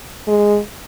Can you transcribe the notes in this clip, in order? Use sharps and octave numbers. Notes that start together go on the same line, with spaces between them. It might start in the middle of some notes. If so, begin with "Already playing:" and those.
G#3